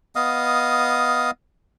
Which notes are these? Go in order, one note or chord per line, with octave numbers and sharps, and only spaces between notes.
B3 D#5 F5 D#6